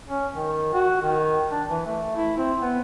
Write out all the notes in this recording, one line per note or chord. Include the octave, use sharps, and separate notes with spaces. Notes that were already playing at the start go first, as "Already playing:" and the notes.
C#4
D#3
F#4
D#3
D4
E3
A3
E4
C4
B3